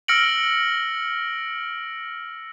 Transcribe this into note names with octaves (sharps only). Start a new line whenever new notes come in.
E6 F6 A#6 C#7 D7 F#7